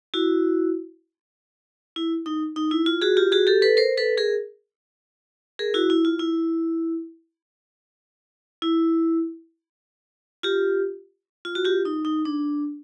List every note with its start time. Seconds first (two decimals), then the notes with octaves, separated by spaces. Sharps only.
0.14 E4 F#4
1.96 E4
2.26 D#4
2.56 D#4
2.71 E4
2.86 F4
3.02 F#4 G#4
3.17 F4 G4
3.32 F#4 G#4
3.47 G4 A4
3.62 A4 B4
3.77 A#4 C5
3.97 A4 B4
4.18 G#4 A#4
5.59 G#4 A#4
5.74 E4 F#4
5.90 E4
6.05 F4
6.19 E4
8.62 E4
10.43 F4 G4
11.45 F4
11.55 F#4
11.65 F4 G4
11.85 D#4
12.05 D#4
12.25 D4